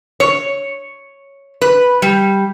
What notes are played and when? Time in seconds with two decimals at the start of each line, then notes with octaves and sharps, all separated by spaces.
0.20 C#5
1.62 B4
2.02 G3